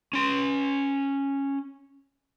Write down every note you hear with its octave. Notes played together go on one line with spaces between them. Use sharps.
C#4 C6